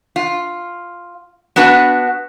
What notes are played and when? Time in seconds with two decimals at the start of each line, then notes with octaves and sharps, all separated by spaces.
0.16 F4
1.56 B3 D4 F#4 B4